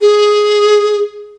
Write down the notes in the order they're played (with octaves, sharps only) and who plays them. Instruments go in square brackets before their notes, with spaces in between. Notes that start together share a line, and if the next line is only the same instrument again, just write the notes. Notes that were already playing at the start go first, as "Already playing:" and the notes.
[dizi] G#4